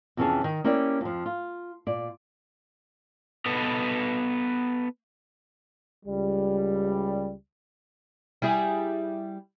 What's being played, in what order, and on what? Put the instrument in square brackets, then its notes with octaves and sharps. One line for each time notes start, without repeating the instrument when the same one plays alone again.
[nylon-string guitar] F2 C3 E3 C#4 G#4 A5
D#3
A#3 C#4 E4 G4 D5
F2 F3
F4
A#2 D5
[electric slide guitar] B3 A4 B4 D#5
[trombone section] C#2 G3
[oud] G3 E4 G#4